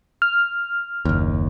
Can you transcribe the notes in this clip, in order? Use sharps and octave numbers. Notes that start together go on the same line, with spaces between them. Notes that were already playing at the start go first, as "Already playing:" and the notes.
F6
F#1 D#2